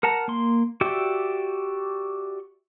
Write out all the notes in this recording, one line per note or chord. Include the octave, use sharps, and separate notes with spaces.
A#4 F#5 A5 A#5
A#3 C6
F#4 G4 D5 E5 G5